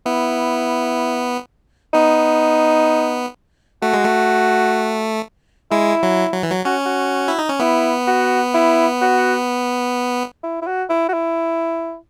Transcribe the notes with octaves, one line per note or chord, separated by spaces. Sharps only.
B3 E4
B3 D#4
A3 F#4
G#3
A3
G#3 E4
F#3
F#3
E3
F#3
C#4 F#4
F#4
E4
D#4
C#4
B3 E4
F#4
E4
F#4
E4
E4
F#4
E4
F#4
E4